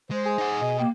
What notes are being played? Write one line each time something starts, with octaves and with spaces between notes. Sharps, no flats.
G#3 C5
G#4
D#4 F#5
B2 D#5
A#3 G4